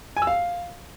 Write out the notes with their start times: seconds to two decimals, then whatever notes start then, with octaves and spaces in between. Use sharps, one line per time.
0.17 G#5
0.22 E6
0.27 F5